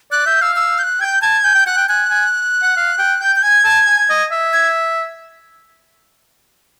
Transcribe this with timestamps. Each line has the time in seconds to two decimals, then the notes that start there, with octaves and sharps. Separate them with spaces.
0.11 D5 F#6
0.26 E5 G6
0.41 F5 E6
0.56 E6
0.78 G6
0.83 F#6
1.01 G5 G#6
1.04 G6
1.22 A5 G#6
1.44 G#5 G6
1.55 G5
1.66 F#5 F#6
1.77 G5
1.89 G#5 F#6
2.10 G#5
2.62 F#5
2.77 F5
2.99 G5
3.21 G5 G6
3.35 G6
3.42 G#5 G#6
3.64 A5
3.87 G#5
4.10 D#5
4.32 E5
4.53 G#6